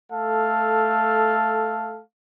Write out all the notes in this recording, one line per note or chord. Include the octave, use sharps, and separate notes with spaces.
A3 A4 F5